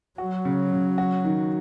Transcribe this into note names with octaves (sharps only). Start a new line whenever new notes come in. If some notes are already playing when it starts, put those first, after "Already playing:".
F#3 F#4
C#3
C#3
F#4
D#3